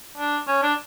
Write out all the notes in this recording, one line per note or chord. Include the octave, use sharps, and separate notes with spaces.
D4
C#4
D4